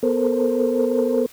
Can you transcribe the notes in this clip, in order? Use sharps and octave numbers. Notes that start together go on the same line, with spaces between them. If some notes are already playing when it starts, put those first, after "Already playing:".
B3 A4 A#4 C5